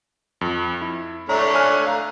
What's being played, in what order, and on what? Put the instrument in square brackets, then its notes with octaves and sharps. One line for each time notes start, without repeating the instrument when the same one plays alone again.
[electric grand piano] F2
E4
[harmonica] A3 D4 C#5 [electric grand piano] A#5
[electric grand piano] G#5 F6 F#6
F5 A#5